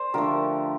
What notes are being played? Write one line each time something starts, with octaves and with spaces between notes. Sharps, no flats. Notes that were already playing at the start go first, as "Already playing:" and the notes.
Already playing: C5 D5
D3 F3 A3 G4 A#4